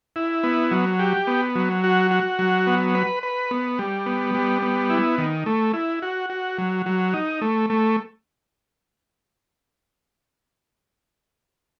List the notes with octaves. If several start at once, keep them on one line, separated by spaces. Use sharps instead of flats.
E4
B3
F#3
G4
B3
F#3
F#4
F#4
F#3
B3
B4
B4
B3
G3
B3
G3
B3
E4
D#3
A3
E4
F#4
F#4
F#3
F#3
D#4
A3
A3